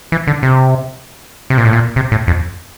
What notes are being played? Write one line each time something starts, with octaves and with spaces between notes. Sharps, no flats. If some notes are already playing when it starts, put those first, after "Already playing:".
E3
D3
C3
C3
A#2
A2
A#2
C3
A2
F2